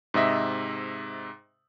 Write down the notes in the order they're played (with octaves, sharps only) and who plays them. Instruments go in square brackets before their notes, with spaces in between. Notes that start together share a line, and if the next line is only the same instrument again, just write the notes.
[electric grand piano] G#2 C3 D#5 E5